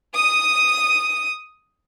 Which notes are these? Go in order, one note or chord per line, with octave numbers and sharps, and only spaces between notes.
D#6 D#7